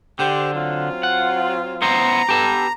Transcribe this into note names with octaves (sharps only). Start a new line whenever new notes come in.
D3 G4 C5
F#3 C4 F4
F#5
B3 E4 C5 A#5
B3 G4 A4 A5